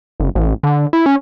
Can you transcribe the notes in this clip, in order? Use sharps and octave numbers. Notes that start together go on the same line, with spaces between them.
F#1
A1
D3
E4
C#4